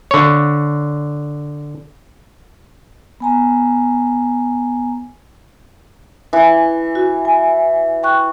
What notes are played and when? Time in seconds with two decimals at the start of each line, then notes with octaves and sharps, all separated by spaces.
0.11 D3 C#5
3.20 B3 G#5 A#5
6.33 E3
6.95 F#4
7.25 G#5
8.03 G5 C#6 F#6